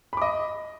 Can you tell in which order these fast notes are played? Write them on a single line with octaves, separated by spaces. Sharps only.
B5 D6 D#5